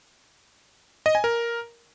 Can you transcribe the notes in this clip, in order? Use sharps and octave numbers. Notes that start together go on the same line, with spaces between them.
D#5
G#5
A#4